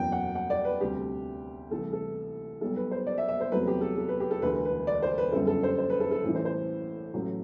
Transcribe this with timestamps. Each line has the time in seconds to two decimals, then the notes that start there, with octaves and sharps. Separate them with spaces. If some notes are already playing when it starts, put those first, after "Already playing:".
Already playing: F#1 E2 B2 F#3 G5
0.12 F#5
0.35 F#5
0.50 D5
0.65 B4
0.80 D2 C3 G3 G4
1.70 C2 C3 E3 A3 A4
1.93 A4
2.61 B1 B2 G3 A4
2.76 B4
2.91 C5
3.07 D5
3.18 E5
3.28 E5
3.41 C5
3.52 E2 C3 F#3 A3 B4
3.67 G4
3.81 A4
3.97 A4
4.09 B4
4.20 G4
4.31 A4
4.42 E1 D2 D3 B4
4.65 B4
4.87 D5
5.02 C5
5.18 B4
5.32 G1 F#2 D3 G3 A4
5.47 A4
5.63 C5
5.78 C5
5.90 B4
6.00 A4
6.11 A4
6.23 A1 A2 E3
6.35 C5
6.45 C5
7.14 A1 A2 F#3 A3